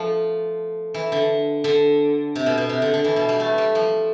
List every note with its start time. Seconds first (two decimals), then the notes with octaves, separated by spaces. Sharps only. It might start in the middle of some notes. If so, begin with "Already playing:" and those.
Already playing: F3 A3
0.94 E3
1.12 D3
1.64 D3
2.35 C3
2.46 B2
2.58 B2
2.69 C3
2.82 D3
2.94 D3
3.04 E3
3.16 B2
3.29 G3
3.40 A3
3.58 G3
3.75 F3